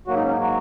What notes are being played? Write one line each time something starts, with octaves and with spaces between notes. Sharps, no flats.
G#2 F#3 A#3 F#4
D#4
C#4
D#4
F#4